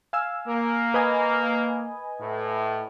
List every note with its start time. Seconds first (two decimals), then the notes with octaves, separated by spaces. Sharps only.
0.13 F5 G#5 E6
0.47 A#3
0.94 B4 D#5 G#5
2.20 A2